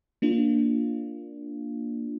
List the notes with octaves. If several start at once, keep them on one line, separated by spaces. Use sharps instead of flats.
A#3 D4 F4